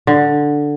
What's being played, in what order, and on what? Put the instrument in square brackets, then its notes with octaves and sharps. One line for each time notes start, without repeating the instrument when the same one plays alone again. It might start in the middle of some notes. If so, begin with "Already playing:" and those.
[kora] D3